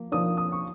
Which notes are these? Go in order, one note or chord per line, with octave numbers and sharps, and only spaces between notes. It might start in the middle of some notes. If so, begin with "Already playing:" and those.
Already playing: F3 A#3
F3 A#3 D4 D#6
D#6
C#6